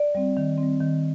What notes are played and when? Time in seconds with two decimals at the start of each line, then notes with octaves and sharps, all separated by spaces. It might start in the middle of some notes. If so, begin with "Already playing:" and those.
Already playing: D5
0.15 G3 C4
0.37 D#3
0.58 G3 C4
0.80 D#3